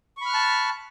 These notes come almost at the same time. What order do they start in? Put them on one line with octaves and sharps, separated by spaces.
C#6 B5 F6 F#6 A5